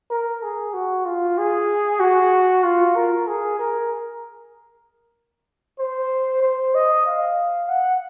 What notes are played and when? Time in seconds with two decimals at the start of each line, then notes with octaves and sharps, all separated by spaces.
0.11 A#4
0.43 G#4
0.74 F#4
1.06 F4
1.38 G#4
2.00 F#4
2.64 F4
2.96 A#4
3.27 G#4
3.59 A#4
5.79 C5
6.43 C5
6.75 D#5
7.06 F5
7.69 F#5